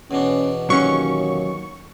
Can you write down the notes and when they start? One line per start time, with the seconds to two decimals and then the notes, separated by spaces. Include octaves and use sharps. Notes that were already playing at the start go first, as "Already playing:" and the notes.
0.11 E2 B2 C#4 D4
0.70 D#2 F#3 C#4 C#6